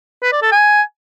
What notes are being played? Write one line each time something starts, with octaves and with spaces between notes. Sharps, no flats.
B4
D5
A4
G#5